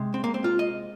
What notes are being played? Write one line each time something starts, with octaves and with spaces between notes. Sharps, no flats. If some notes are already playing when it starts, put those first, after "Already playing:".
Already playing: C3 G#3
C4
A#3
C4
F4
D#5